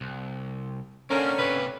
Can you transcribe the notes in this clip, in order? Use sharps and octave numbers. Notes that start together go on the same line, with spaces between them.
C2
D3 A#3 C4 C#4 A#4
C3 A#3 B4